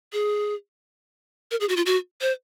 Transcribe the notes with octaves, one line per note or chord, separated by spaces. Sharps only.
G#4
A#4
G#4
F#4
F4
F#4
C5